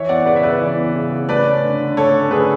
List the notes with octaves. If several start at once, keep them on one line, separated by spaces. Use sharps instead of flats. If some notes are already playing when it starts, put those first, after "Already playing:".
Already playing: E3 C#5 E5
B3 D5 F#5
C#3 B4 D5
E5
C#3 B4 D5
E3
B3
C#3
C#3
A3 B4 D5
C#4
D3
D3
A3 A4 C#5
C#4
D3 G#4 B4